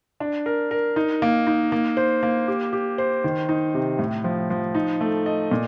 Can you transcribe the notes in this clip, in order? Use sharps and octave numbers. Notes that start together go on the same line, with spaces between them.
D4
A#4
A#4
D#4
A#3
D#4
A#3
C5
A#3
G4
G4
C5
D#3
D#4
C3
A2
F3
F3
D#4
A3
D#5
A#2